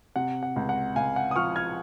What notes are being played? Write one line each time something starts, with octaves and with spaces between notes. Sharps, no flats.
C3 F#5
F#5
C#2
F#5
C#2 F5 G#5
F#5
D#6
F3 C#6 F6
F6 G#6